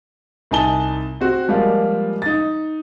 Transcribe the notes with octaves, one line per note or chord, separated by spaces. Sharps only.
C2 D#4 G#5 A5 G7
C4 F#4
F3 G3 G#3 A#3 F4
D#4 A6